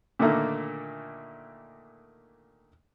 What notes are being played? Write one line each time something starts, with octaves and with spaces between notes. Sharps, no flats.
A#2 D3 D#3 A3 A#3